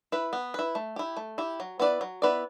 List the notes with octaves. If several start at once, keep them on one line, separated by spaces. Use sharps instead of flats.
E4 B4
B3
E4 B4
A3
E4 G4
A3
E4 G4
F#3
B3 E4 B4 D5
F#3
B3 E4 B4 D5